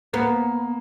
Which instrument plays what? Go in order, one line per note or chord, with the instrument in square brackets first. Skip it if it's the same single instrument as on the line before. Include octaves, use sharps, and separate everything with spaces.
[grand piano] A#3 [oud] B3